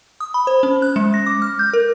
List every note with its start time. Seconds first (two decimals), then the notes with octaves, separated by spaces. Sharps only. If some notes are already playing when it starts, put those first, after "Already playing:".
0.20 D#6
0.34 B5
0.47 C5
0.63 C#4
0.82 F#6
0.96 G#3
1.14 A#6
1.26 D6
1.42 F6
1.59 G6
1.73 A#4